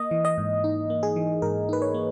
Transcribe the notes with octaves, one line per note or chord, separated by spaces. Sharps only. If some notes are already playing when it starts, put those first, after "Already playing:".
Already playing: A#3 D#5
E3
D#5
G#2
D#4
A#3
G#4
E3
G#2 A#4
D#4 B4
C#5
A#3